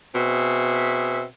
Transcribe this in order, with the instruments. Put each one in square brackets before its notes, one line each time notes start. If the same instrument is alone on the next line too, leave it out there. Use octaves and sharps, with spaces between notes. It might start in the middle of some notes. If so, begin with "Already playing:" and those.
[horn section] B2 C4 G#4 E5